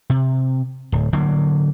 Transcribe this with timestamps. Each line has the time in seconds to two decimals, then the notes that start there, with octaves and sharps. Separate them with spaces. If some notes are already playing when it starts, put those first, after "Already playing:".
0.10 C3
0.92 D1
1.13 D3 F#3 A#3